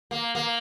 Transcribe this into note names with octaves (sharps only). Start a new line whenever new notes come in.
A#3
A#3